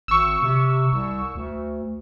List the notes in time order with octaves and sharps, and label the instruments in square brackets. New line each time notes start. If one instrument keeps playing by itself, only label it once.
[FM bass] G#1 [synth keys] C#6 E6
[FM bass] C3
C2
D2